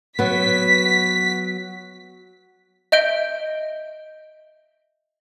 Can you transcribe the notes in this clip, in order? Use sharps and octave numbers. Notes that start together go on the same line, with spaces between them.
F#3 B3 B6
D#5 E5 G6 D7 G7